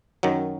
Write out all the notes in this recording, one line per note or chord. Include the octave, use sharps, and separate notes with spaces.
F#2 D#3 F#3